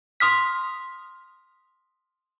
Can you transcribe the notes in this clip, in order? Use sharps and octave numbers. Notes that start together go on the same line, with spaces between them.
C6 D#6 F6 B6